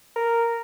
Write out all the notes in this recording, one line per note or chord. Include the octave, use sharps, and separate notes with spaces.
A#4